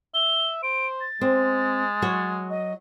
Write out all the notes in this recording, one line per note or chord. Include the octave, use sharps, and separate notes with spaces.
E5 G7
C5 D7
A6
G#3 C4
F#3 F#4 C#5
D#5